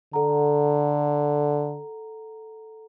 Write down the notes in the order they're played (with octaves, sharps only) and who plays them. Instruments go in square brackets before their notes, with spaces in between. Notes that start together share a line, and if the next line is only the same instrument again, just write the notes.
[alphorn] D3 [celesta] A4 F#5 A#5